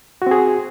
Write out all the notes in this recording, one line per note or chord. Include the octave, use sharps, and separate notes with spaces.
C4 F#4 G#4